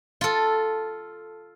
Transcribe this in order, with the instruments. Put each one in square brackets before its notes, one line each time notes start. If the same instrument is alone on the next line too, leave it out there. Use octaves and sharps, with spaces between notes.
[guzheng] F4 A4